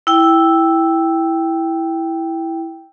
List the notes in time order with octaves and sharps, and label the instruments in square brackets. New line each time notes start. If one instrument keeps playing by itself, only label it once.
[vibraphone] E4 G5